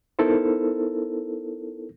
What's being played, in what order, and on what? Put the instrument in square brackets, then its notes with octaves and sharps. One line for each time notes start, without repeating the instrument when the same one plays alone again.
[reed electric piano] B3 D#4 E4 A4 A#4 C5